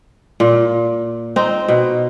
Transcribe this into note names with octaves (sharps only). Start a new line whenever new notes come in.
A#2
C4 D#4
B2